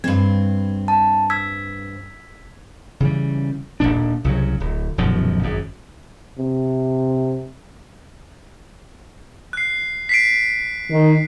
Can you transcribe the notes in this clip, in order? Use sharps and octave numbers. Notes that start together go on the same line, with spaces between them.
G2 C4 G#6
A5
E6 G#6 B6
C#3 E3 G3
D#1 A#1 A#2 D4
C2 C#3 F#3
D1
D#1 F#2 B2 F3
G#1 F#2
C3
F#6 C7
B6 C7 D7
D#3